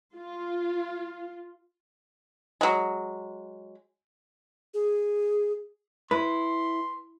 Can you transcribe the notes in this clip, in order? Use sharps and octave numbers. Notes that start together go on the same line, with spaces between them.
F4
F#3 G#3
G#4
E4 B4 C6